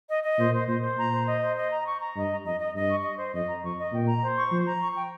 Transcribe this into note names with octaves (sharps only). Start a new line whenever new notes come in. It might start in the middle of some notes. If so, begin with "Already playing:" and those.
D#5
D#5
A#2 C5
C5
A#2 C5
C5
A#2 A#5
C5
D#5
C5
D#5
A#5
C#6
A#5
G2 D#5
A#5
F2 D#5
D#5
G2 D#5
C#6
D#5
C5
F2 D#5
A#5
F2 C#6
D#5
A#2 G5
A#5
C5
C#6
F3 C5
A#5
C#6
G5